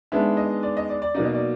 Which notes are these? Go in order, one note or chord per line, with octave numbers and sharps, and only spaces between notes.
D#3 G#3 B3 D4 E5
D#5
D5
D#5
D5
D5
B2 F#3 A#3 D#4 D5
D#5
D5